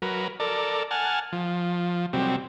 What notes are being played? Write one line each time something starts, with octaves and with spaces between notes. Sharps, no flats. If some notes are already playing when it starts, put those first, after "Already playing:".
F#3 A#4 B4
A4 A#4 D5
F#5 G#5 A5 F6
F3
C3 F#3 G3 C4